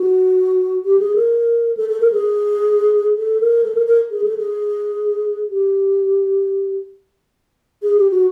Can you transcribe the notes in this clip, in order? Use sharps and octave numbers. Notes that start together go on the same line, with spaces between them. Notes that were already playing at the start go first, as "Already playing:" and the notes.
Already playing: F#4
G4
G#4
A#4
A4
A4
A#4
G#4
A4
A#4
A4
A#4
A#4
G#4
A4
G#4
G4
G#4
G4
F#4